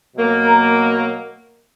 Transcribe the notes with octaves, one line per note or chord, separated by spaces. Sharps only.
B2 F#3 A#3
A#4